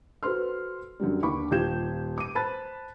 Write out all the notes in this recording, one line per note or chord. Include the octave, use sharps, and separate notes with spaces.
F#4 A4 B4 C5 C6 F6
F#2 D3 F#3 G3
D#2 D3 B5 C#6 D6
D#1 F4 G4 G6 G#6 E7
D6 D#7
C5 A5 B5 F#6 A6